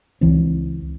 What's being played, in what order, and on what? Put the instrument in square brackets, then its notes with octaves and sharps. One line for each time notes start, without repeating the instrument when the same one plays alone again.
[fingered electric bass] C#2 E3 C4